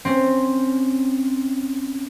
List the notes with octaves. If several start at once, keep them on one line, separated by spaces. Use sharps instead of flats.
C4 C#4